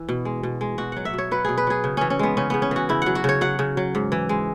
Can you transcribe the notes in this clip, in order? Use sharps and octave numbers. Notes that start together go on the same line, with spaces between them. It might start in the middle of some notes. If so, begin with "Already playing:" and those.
Already playing: E3
B2
G#3
B2
G#3
B2 F#4
F#3 F#5
E5
B2 C#5
F#3 B4
B2 G#4
B4
F#3 G#4
C#3
E3 C#4
C#4
G#3 B3
C#3 C#4
C#3 B3
C#4
E3 F#4
C#3 E4
F#3 F#5
F#4
C#3 C#5
F#3 F#5
C#3
F#3
G#2
E3
G#3